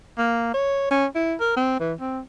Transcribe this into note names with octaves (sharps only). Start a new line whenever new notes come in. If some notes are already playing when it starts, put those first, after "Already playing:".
A#3
C#5
C#4
E4
A#4
C4
E3
C4